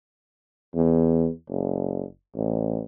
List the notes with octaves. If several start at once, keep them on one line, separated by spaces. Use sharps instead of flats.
E2
F#1
A1